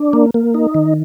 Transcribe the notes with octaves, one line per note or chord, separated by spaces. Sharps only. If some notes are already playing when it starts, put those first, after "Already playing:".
Already playing: D4
A#3
A#3
D#4
D#3